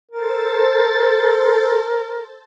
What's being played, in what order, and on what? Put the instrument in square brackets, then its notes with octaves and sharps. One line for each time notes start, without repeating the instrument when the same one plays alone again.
[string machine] A4 C5 A6 [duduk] A#4